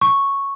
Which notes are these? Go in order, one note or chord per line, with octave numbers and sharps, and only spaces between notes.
C#6